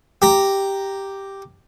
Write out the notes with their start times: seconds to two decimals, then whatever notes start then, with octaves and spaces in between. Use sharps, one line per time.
0.22 G4 A#5